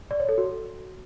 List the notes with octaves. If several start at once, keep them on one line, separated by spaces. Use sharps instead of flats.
D5
C#5
A4
F#4